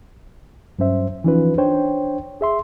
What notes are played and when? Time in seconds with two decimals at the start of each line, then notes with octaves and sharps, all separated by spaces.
0.79 G2 F#3 C#4 C5 E5
1.24 E3 F3 C#4 D#4 F4 B4
1.58 D4 C5 C#5 G5
2.41 G#4 E5 C6